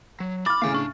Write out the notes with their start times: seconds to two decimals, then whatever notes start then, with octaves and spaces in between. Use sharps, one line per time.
0.20 F#3
0.46 B5 D6 F6 A6
0.62 A2 C#3 F5 G#5
0.74 D4 C#6